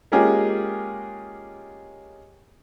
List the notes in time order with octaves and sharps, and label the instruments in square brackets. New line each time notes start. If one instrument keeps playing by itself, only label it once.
[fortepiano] G#3 A#3 C#4 F4 G4 G#4